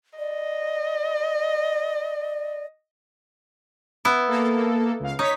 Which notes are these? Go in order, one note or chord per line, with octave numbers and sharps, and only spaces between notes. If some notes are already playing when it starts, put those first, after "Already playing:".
D5 D#5
B3 E4
A#3 A4
C#2 F5
D#4 C#5 B6